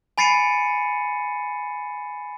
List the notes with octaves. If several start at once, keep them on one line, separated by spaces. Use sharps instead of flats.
G#5 B5 A6 C7 C#7 D#7